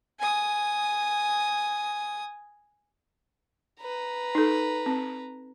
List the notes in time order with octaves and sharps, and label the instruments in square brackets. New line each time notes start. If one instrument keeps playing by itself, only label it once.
[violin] G#5 D#6
[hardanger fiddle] B4 A#5
[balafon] D#4 A4
C4